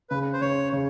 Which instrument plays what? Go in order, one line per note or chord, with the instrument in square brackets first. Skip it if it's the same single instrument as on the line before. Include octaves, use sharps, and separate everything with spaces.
[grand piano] C#3 [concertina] B4
[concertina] C5
[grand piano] C#3 [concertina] C#5
[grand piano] C#3